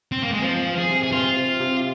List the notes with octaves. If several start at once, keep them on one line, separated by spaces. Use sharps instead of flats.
C4
A#3
G#3
F3 C4
C4
G#4
C3
G#4
C4 F4
C3
C3